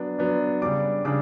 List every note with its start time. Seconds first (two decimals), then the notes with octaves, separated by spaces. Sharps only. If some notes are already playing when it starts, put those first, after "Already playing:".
Already playing: F#3 B3 D4
0.18 F#3 B3 D4
0.62 C#3 G3 D4 D6
1.05 C#3 G3 D4 D6